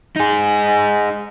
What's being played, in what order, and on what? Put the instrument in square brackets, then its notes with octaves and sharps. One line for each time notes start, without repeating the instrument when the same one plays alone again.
[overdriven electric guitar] D#4 G#4